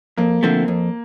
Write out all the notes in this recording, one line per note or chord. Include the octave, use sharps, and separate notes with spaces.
F2 A#3
D3 F3 A3 C4
F2